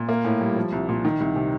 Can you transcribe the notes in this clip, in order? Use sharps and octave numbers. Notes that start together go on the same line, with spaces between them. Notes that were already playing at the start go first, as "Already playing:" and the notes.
Already playing: A#2
A#3
A2
G3
F3
C2
A#2
D#3
C2
C3